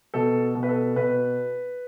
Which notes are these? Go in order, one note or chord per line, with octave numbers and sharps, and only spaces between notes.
B2 A4
B2
B4
A4
B2 B4